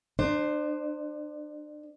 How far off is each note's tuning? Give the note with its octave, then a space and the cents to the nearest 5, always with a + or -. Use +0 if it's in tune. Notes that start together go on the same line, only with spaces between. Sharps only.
D4 +35 C5 +0